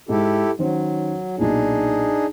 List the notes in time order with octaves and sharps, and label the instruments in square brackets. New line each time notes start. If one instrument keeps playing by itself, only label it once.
[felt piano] G#2 [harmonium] E4 G4 A4
[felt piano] D#3 C#4 C5 [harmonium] F#3
[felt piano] B1 A#2 [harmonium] D4 D#4 G#4